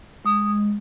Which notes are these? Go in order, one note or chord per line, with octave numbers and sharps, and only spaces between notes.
G#3 D#6